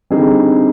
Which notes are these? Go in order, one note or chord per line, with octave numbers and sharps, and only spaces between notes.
D3 G3 C4 D#4 G#4